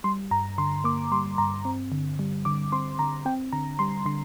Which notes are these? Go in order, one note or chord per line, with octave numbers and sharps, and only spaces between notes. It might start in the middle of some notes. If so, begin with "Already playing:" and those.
G3 C6
G2 A#5
D3 C6
A#3 D6
G3 C6
G2 A#5
C4
D3
G3
D3 D6
C4 C6
D3 A#5
C4 G5
D3 A#5
G3 C6
D3 C6